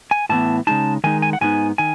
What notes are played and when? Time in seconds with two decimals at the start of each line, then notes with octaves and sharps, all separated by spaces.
0.11 G#5
0.29 A2 E3 B3 A5
0.67 C#3 G#3 D#4 A5
1.04 D#3 G#3 D#4 G#5
1.22 G#5
1.33 F#5
1.41 G#2 E3 G#3 B3 D#4 G#5
1.78 D#3 G#5